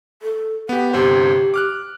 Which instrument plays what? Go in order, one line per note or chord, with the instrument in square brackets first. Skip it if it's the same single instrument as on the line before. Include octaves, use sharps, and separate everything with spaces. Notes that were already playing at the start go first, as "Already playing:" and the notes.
[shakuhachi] A4
[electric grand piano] B3 G4 [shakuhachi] F#5
[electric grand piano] G1 C3 C5 [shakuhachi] G4
[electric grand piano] D6 F6 F#6